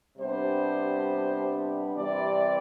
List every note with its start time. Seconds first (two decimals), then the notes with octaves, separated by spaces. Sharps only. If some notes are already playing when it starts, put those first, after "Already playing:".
0.17 C3 G3 B3 D4 C5
1.96 C3 E3 G3 D5